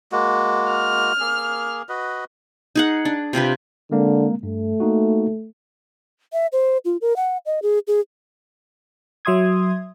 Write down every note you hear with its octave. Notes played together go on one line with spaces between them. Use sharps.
G#3 A#3 F#4
F6
A#3 G#4
F#4 B4 D#5
D#4 G#4 F#5
D4
C3 F4 G4 B4
D3 G#3 A#3 C4
G2 A3
A#3 D#4 F#4
E5
C5
F4
A#4
F#5
D#5
G#4
G#4
F#3 E5 C6 D#6 G#6